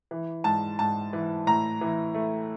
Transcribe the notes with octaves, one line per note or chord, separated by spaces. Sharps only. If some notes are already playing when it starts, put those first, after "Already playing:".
E3
G#2 A5
G#2 A5
E3
A2 A#5
E3
A3